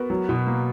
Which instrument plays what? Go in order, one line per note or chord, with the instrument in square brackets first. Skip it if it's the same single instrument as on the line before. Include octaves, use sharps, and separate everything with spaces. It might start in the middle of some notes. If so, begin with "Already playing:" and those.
Already playing: [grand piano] B3 F#4 A#4
F#3
B2
A#3